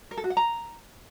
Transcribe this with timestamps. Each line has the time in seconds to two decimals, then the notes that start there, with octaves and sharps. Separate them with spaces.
0.11 A#4
0.17 A4
0.24 F#4
0.30 F#5
0.37 A#5